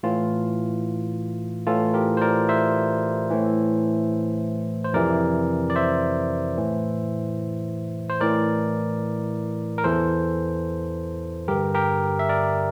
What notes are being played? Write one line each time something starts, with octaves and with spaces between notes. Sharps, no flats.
A2 E3 F4
A2 E3 F4 A4
G4 A#4
C5
A#4 D5
C5 E5
A2 E3
C5
F2 C3 E3 A#4 D5
D5
C5 E5
A2 E3
C5
A2 E3 A#4 D5
A#4
E2 E3 A4 C5
G2 D3 G4 A#4
G4 A#4
E5
A#4 D5